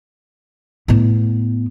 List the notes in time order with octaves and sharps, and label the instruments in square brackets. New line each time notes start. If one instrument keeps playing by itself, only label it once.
[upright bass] A2 B3